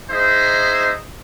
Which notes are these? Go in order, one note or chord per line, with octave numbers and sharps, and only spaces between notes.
D#4 G#4 C5 D#5 E5